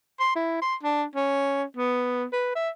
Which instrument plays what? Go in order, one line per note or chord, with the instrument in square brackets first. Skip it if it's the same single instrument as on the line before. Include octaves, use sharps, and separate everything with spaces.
[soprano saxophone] C6
E4
C6
D4
C#4
B3
B4
E5